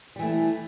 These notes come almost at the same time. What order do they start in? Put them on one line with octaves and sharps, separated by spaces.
G3 E3 A3